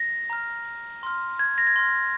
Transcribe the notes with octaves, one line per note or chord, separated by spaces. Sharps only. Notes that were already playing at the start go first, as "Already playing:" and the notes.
Already playing: A#6
A#5 F6
C6 F6
G#6
A#6
G#6
C6 F6